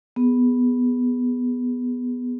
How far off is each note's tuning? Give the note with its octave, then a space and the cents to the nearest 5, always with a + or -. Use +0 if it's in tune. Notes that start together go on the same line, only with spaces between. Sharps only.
B3 +0 G#4 +0